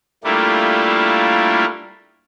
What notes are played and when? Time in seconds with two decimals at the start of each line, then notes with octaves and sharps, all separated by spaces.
0.24 G3 A3 A#3 D4 E4 F4